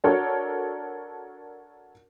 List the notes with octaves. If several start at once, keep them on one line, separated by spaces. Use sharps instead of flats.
D4 F#4 A4 A#4 C#5